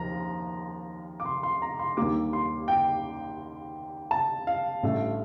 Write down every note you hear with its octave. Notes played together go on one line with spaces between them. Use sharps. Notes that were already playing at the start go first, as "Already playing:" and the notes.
Already playing: D#2 F3 A#5
D6
C6
C6
A#5
C6
D#2 D3 G3 A#3 D6
C6
G5
A5
F5
A1 G2 D3 A3